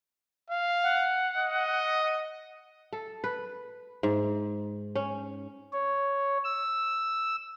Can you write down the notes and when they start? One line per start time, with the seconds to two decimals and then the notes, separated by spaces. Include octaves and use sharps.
0.50 F5
0.83 F#5
1.37 D#5
2.93 A4
3.24 B4
4.03 G#2
4.95 C#4
5.73 C#5
6.44 E6